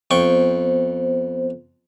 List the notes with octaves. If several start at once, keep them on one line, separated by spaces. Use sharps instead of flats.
F2 B3 C5 G5 C#6